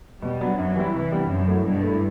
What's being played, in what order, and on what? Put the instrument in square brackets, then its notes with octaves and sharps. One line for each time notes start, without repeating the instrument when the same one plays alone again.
[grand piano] B2 [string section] G3
[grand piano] F#3 B3 D4
[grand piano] F#2 [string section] F#3
[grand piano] E3 G3 C4 E4
[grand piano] C2 [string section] E3
[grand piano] C3 G3 B3 D4
[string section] F#2 [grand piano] C3
[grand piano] F#3 A3 E4
[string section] G2 [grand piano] B2
[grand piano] A3 E4